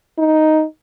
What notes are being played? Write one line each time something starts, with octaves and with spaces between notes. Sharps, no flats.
D#4